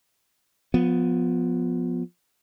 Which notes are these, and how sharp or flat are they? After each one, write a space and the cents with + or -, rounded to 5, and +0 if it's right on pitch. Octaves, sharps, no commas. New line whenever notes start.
F3 +25 B3 +0